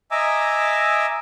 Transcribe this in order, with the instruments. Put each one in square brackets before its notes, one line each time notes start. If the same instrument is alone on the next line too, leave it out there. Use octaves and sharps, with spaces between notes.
[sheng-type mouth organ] D#5 E5 G#5 A#5 D6 E6